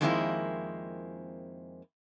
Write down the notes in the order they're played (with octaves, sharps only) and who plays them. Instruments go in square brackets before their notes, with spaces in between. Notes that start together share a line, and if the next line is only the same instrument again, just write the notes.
[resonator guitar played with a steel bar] F2 D#3 G#3 A#3 C4 E4